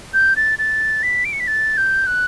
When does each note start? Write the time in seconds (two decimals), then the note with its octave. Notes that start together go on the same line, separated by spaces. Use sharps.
0.14 G6
0.36 A6
0.59 A6
1.03 B6
1.25 D7
1.33 C#7
1.40 B6
1.47 A6
1.77 G6
2.07 F#6